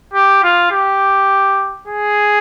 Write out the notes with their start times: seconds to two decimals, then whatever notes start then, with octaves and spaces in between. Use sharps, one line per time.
0.13 G4
0.43 F4
0.71 G4
1.87 G#4